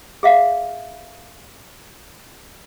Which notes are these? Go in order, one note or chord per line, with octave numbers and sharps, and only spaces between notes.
G#4 E5 F5